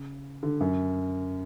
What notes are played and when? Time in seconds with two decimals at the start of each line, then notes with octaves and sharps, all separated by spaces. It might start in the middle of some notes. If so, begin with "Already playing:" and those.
Already playing: C#3
0.43 D3
0.61 F#2